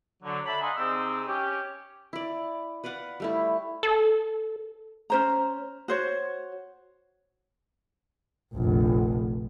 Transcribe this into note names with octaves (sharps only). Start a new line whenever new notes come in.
D3 F#3
D4 A4 E5 A#5 B5
D5 D#5 F5 F#5 G#5 C6
C3 C4 D#4 G#4 E6
C#4 G4
E4 D5
B4 D5 F5 F#5
G3 A3 E4
A4
C#4 C5 A#5
F#4 C5 C#5
F1 A#1